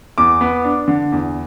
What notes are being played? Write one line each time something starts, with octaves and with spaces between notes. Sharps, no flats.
E2 D6
B3
D4
D3
E2